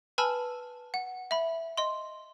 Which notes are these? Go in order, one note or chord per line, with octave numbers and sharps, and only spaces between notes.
B4 G#5 A5 B5 E6 F6
F#5
E5 B5
D#5 C6